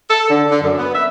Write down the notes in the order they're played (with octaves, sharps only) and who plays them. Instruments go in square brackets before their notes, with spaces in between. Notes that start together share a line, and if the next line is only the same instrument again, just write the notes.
[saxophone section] A4
D3
D3
F#2
B3
E5